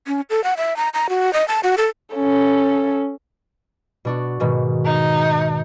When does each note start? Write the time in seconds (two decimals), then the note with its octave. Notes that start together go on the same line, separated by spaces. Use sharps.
0.07 C#4
0.30 A4
0.44 F#5
0.57 E5
0.77 A#5
0.94 A#5
1.10 F#4
1.33 D#5
1.48 A5
1.63 F#4
1.78 A4
2.16 C#4 A4
4.05 B2 D4 F#4
4.40 G#2 B2 D#3
4.85 D#4